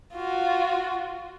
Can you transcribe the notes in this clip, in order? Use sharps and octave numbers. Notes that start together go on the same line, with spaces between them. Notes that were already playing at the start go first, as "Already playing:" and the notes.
F4 F#4